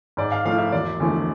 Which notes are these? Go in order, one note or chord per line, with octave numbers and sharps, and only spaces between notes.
G#2 D5
F5
F3 A3 E4 F5
E5
E1 D5
E2 D3 F3 A3